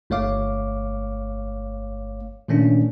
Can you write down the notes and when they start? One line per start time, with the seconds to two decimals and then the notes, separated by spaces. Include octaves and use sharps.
0.10 G1 A3 C#5 F5 D6
2.48 A#2 D#3 A3 C#4 D4